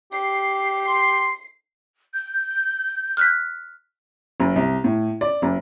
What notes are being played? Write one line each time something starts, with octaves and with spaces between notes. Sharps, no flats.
G4 C7
C6
G6
F6 F#6 B6
F#1
C2
A2
D5
F#1